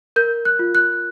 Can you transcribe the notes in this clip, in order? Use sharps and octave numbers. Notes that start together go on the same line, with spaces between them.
A#4 G6
F#6
F4
F#6